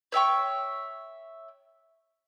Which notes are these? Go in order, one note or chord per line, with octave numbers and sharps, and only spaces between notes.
C#5 E5 G5 C#6